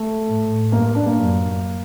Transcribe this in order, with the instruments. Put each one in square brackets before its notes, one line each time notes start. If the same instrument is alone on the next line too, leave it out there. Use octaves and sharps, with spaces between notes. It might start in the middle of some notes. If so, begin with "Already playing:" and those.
Already playing: [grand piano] A3
[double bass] A2
[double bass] G2 [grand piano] A#3
[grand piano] D4
A#3
[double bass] F#2